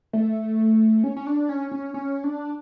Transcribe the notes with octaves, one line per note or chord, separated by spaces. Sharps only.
A3
C#4
C#4
D4
C#4
C#4
C#4
D4